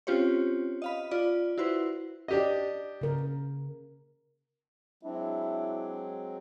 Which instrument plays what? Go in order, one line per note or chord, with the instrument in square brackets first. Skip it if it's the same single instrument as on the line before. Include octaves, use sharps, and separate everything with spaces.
[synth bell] C4 C#4 F4 G4 C5 C#5
D#5 F5 B5
F4 D5
E4 F#4 B4 C5
[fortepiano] D4 G4 D#5
[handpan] C#3 A#4
[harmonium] F#3 G#3 C4 [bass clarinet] D4 [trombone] E4